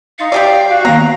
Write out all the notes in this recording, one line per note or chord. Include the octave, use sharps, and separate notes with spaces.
D#4 F5 C6 A6 C#7
G3 G4 D5 E5 G5
F#4
D#3 A#3 B3 A#5